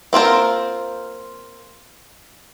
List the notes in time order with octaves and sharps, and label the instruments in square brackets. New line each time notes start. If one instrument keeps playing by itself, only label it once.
[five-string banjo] A#3 C4 F4 A#4